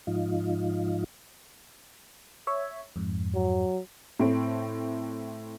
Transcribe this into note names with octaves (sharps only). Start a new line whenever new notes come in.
G#2 F3 D#4 F4
C#5 E5
F2 G#2
F#3
A2 C4 A4